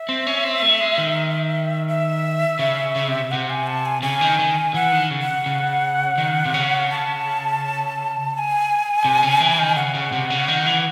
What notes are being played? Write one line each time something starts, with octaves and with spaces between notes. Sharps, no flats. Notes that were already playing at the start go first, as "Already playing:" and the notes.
Already playing: E5
C4
C#4
C4
A3
G#3
D#3
E5
C#3
C#3
C3
C3 F#5
G#5
A5
G#5
C#3 G#5
D#3
D#3
E3 F#5
D#3
C#3
F#5
C#3
D#3
C3
C#3
A5
A5
G#5
C3
C#3
E3
D#3
C#3 F#5
C#3
C3
C#3
D#3
E3